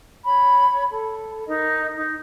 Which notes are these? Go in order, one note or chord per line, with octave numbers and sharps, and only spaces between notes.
C#5 B5
A4
D#4 A#4 D#5
D#4